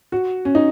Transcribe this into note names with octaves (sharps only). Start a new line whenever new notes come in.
F#4
C#4
D#4